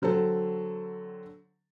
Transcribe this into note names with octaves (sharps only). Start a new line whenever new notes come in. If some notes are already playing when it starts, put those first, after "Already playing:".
D3 F#3 C4 A4